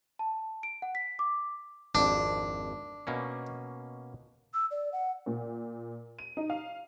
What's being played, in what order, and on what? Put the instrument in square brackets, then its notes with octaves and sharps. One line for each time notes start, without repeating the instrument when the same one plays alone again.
[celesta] A5
D7
F#5
B6
D6
[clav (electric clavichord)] G#1 F2 [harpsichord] D4
[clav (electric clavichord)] B2 A#3 C#4
[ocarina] E6
D5
F#5
[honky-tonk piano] A#2
D#7
D#4
F5